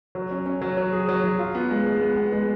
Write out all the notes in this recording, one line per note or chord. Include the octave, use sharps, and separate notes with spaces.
F#3
C#4
C#4
F#3
F#3
G#4
F#3
F#3
F4
B3
G#3
G#3
B3
B3
G#3